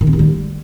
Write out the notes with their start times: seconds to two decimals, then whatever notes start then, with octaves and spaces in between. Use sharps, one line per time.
0.01 D#3
0.07 C4
0.13 D#3
0.19 G3